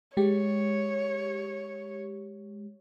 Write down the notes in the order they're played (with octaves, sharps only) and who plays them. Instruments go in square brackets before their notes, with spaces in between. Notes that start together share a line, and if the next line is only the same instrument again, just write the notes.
[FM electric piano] G#3 G4 [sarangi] C#5